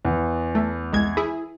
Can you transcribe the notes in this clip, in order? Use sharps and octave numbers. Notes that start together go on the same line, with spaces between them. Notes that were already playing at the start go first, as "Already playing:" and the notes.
E2
A3
C2 G#3 G#6
E4 G#4